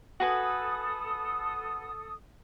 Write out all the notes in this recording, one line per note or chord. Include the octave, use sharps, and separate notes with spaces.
F#4 A4 B4 G#5 D#6